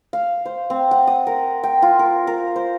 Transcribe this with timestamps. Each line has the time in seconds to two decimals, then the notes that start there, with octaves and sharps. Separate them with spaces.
0.13 F5
0.46 C5
0.70 C4
0.91 F#5
1.07 D#6
1.27 A#4
1.63 G5
1.82 F4
1.99 A#4
2.27 A#4
2.56 C5